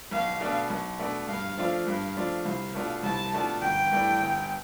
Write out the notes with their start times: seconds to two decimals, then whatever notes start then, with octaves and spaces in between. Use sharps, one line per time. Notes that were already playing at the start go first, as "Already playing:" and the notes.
0.11 B1 F5
0.40 B2 A3 D4
0.70 B1
0.99 B2 A3 D4
1.28 G2 F5
1.57 F3 A3 D4 F4
1.87 G2 F5
2.16 F3 A3 D4 F4
2.45 C2 F5
2.74 B2 A3 D4 F4
3.03 C2 A5
3.33 B2 A3 D4 F4
3.62 G1 G5
3.91 G2 E3 A3 D4
4.20 G1